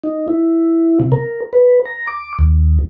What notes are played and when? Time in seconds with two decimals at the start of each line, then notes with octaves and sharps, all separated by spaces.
0.04 D#4
0.28 E4
1.00 C3
1.12 A#4
1.53 B4
1.85 A#5
2.07 D6
2.39 D#2